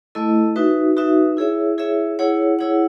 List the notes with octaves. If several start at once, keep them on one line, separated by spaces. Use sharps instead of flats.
A3 E4 A4 D#5
D#4 F#4 B4 E5
D#4 F#4 B4 E5
E4 G#4 C#5 E5
E4 G#4 C#5 E5
E4 G#4 C#5 F#5
E4 G#4 C#5 F#5